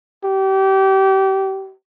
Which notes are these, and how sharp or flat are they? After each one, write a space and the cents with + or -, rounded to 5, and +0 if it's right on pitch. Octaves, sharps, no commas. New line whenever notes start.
G4 -30